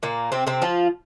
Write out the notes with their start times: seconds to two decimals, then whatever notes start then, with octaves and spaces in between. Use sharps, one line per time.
0.03 A#2 A#3
0.32 C3 C4
0.47 C3 C4
0.62 F3 F4